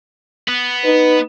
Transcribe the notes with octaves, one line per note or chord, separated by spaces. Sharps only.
B3
D#4 B4